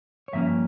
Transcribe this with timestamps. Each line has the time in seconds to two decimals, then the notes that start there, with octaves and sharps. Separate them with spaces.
0.28 C#5
0.33 G2 F3 A#3 C#4 E5